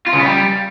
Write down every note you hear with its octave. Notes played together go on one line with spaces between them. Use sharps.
F4
C#3
B3
G3